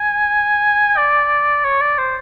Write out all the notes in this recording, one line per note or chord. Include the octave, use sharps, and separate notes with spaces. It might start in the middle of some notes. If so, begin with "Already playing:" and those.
Already playing: G#5
D5
C#5
D5
C5